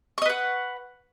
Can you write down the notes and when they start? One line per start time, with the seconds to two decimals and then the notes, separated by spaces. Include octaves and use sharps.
0.18 C#6
0.22 D#5
0.26 B4
0.29 F#5